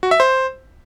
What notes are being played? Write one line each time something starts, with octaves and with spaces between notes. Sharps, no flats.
F#4
E5
C5